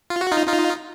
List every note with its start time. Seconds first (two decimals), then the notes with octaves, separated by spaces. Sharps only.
0.10 F4
0.21 F#4
0.31 D#4 F4
0.47 D#4 F4